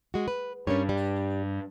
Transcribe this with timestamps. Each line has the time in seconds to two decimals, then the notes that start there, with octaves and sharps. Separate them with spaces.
0.14 G#3 F#4
0.28 B4
0.67 G2 C#4 A#4 C#5
0.89 G3